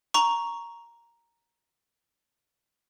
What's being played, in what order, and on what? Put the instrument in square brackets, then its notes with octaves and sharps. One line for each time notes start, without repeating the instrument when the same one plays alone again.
[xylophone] A#5 C#6